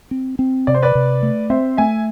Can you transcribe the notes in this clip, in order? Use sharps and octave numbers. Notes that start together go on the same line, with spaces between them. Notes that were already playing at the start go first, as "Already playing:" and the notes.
C4
C4
C3 D5
C5
B4 D5
C3
A3
C4 C5 E5
A3 E5 G#5